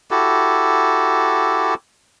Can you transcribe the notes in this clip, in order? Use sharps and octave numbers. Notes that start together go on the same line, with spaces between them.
E4 F#4 G4 A4